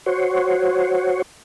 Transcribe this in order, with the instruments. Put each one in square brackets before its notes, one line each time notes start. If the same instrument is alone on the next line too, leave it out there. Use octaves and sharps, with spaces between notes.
[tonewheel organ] F#4 C5 C#5